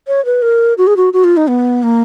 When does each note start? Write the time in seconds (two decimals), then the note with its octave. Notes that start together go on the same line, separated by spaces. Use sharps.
0.07 C#5
0.25 B4
0.42 A#4
0.78 F#4
0.87 G#4
0.97 F#4
1.13 F#4
1.24 F4
1.37 D#4
1.49 B3
1.83 A#3